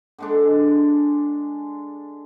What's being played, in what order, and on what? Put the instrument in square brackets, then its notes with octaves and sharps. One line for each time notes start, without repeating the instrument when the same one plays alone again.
[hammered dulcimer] D3 G#3 D4